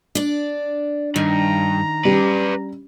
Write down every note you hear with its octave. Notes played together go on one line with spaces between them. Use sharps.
D4 D5
G2 D#3 A#5
G3 C#4 G4 B4 D5